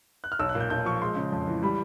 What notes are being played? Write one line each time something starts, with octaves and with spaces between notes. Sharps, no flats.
F#6
F6
B1 E6
F#6
A#2
G6
B1 G6
F3 C#6
G#3 C6
C#3
F2
E3
G3 B5